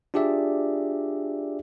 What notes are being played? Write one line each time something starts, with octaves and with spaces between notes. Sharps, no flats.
D4 F4 G4 G#4 D5 E5